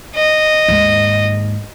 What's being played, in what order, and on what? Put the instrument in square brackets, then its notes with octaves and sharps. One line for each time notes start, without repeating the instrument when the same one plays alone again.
[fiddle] D#5
[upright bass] D#2 G#2